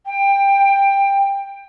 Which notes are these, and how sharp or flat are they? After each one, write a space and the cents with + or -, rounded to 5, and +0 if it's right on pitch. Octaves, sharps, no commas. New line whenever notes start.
G5 +15